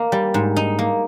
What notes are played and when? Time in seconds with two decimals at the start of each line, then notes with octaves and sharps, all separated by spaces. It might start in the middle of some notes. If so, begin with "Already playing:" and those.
Already playing: A#3 D#4
0.12 G3
0.34 G#2
0.56 D#4
0.79 A#3